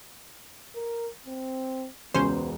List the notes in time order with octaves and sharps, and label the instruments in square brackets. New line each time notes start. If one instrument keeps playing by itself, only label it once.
[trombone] A#4
C4
[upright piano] E1 C#2 [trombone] B3 [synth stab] C#4 C5